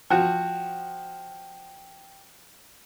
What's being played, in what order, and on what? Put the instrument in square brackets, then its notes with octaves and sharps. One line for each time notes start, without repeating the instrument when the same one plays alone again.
[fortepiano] F3 F#4 [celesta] G5